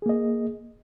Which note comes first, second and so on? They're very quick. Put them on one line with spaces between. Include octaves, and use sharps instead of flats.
G#4 A#3 D#5